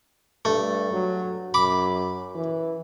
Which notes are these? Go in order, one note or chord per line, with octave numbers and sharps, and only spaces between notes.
G2 A3
F#3
F#2 B5 D6
E3